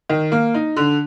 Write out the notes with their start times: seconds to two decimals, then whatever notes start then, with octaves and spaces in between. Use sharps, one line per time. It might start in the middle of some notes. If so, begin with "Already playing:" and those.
0.09 D#3
0.32 A#3
0.54 D#4
0.76 D3